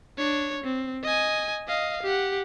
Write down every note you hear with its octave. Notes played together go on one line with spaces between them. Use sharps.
D4 C#5
C4
D#5 G#5
D#5 F5
G4 F#5